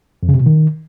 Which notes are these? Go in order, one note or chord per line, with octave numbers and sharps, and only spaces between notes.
F2
C#3
C3
B2
D#3